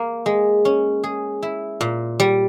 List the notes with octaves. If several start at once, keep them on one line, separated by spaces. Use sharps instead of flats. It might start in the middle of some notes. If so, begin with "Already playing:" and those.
Already playing: A#3
G#3
C#4
G#4
E4
A#2
G3